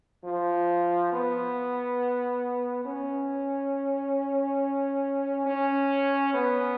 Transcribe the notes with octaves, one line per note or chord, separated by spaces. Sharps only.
F3
B3
C#4
C#4
B3